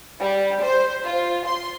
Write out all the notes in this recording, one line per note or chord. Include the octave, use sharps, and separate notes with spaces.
G3
C5
F4
C6